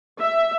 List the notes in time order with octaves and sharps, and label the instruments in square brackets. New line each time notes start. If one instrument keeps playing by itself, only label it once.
[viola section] E5